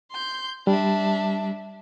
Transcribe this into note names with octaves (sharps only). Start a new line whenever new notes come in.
C6 G6
G3 D4 E5